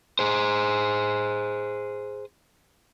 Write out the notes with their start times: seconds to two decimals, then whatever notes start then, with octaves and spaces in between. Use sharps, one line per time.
0.19 G#4 C5